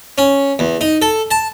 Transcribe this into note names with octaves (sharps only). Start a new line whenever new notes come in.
C#4
E2
D#4
A4
A5